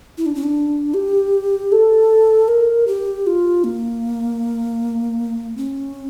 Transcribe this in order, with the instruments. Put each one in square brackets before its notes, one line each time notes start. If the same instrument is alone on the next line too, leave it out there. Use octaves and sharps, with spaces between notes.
[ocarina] E4
D4
C#4
D4
G4
A4
A#4
G4
F4
A#3
C#4